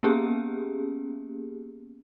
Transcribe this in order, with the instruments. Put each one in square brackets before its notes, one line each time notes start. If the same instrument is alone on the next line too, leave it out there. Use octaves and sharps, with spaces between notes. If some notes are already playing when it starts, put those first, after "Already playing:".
[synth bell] A#3 B3 C#4 G4 G#4